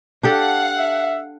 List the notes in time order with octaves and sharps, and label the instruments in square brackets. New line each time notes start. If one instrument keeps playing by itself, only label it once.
[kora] D4 G4 A4 [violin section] F5 F#5
[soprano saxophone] E5